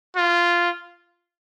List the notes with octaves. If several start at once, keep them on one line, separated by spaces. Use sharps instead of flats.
F4